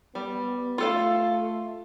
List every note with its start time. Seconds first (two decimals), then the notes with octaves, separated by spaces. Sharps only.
0.15 G3 B3
0.78 A3 F4 A4 F5